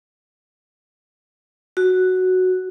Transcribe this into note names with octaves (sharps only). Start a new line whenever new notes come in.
F#4